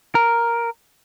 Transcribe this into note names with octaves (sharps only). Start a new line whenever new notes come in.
A#4